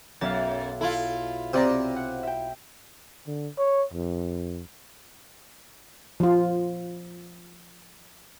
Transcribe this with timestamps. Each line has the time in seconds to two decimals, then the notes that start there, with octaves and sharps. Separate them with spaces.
0.21 B1 F#2 E5 F5 A6
0.81 E4 F4 A4
1.53 C3 C5 D5 A#5
1.97 F#5
2.23 E5 G5
3.27 D3
3.58 C#5
3.93 F2
6.20 F3 F4